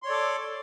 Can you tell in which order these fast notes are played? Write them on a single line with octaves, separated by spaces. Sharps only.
C6 C#5 D5 A4 D6